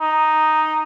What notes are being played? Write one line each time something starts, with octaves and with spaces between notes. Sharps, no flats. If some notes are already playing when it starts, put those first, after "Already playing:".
D#4